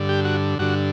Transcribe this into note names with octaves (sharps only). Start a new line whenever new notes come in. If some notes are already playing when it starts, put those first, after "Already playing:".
Already playing: G2 D3
G4
F#4
G2 D3 F#4